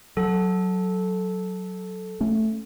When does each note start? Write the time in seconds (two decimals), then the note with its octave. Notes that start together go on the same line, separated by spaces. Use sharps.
0.17 F#3 A4
2.20 A3 C#4